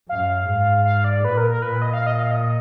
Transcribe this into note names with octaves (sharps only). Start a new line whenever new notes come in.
F#2 F5
G#2
F5
D5
A#2 B4
A#4
A#4
A#2 B4
D#5
F5
D#5
F5
D#5